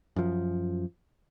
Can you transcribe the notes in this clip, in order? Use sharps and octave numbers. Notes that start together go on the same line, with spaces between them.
F#2 F3